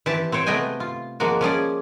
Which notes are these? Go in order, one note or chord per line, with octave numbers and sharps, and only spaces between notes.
E3 C4 G4 A5
C4 C5 C#5 G5
C3 A3 B3 D#5 G5 G#5
F4
F3 G#3 A#3 F#4
F3 C#4 G#4 D5